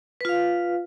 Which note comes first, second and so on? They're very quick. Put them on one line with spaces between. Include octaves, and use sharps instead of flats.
B4 F4 F5